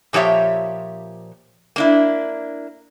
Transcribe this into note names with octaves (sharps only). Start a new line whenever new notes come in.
A#2 F3 G4 C#5 E5
A#3 D4 E4